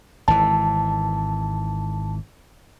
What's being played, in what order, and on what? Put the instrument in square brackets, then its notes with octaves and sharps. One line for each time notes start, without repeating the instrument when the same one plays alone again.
[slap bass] G#1 E3 [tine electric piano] A5